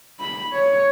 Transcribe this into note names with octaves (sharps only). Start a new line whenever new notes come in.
B5
C#5